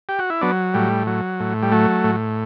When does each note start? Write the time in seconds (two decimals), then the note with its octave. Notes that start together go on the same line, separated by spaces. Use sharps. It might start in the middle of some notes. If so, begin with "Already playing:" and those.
0.09 G4
0.19 F#4
0.30 E4
0.41 F#3 B3 D4
0.74 A2 G3
1.07 F#3
1.40 A2
1.63 G3
1.72 F#3 A3
2.04 A2